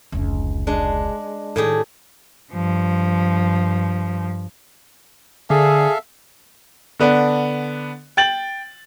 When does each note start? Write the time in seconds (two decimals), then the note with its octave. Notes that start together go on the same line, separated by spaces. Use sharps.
0.12 F1 C#2
0.67 G#3 D4
1.56 A2 D#3 G4 G#4
2.53 G2 F3
5.50 D3 G#4 A4 E5 F5
6.99 D3 B3 D4
8.17 G5 A6 F#7